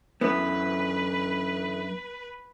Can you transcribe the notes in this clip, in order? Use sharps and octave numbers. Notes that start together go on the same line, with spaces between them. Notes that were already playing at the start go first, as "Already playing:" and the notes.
F#2 D3 E3 B3 E4 B4